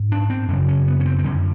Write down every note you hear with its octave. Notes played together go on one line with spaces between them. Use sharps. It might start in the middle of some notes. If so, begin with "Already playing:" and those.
Already playing: G#2
D4
C4
F#2 C#3 C#4
C#4
B3
C#4
C4
C4
F#2 D3 C#4